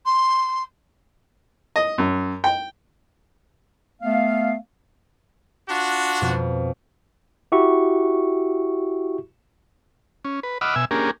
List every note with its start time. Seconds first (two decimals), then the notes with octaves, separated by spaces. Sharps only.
0.05 C6
1.76 D#5
1.98 F#2
2.44 G5
4.02 A3 B3 F5
5.69 D4 F4 F#4
6.21 F2 B2
7.52 E4 F#4 G4 E5 C#6
10.25 C#4
10.43 B4
10.61 D#5 F#5 B5 D6 E6 F6
10.76 B2 E5 G#5 E6
10.91 A#3 C#4 D4 G4 G#4 A#4